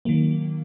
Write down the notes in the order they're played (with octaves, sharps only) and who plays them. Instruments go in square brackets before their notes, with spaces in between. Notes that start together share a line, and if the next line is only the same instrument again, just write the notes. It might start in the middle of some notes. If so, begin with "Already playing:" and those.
[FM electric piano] D#3 F#3 A#3